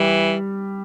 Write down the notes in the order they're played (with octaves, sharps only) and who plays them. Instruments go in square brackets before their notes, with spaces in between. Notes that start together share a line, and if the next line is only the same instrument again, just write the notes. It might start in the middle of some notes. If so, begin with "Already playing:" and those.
Already playing: [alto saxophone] E3 [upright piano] G3